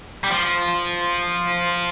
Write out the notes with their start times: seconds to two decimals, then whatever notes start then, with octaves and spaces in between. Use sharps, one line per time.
0.24 G3
0.30 F3